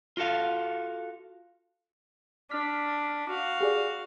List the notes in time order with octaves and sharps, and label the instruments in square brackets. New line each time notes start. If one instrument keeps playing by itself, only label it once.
[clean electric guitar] F4 F#4 A4 F5
[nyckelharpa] D4 [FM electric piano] F6 B6
[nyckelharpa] F#4 F5
[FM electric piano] G4 G#4 D5